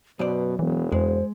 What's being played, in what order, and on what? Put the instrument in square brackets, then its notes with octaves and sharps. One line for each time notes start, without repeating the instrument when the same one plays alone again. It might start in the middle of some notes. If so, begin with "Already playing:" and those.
[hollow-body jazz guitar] F#2 C5 D5 [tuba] B2 [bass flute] B4
[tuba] E1 [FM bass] E3 [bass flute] B3
[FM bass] F2 [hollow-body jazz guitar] G#3 [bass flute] C5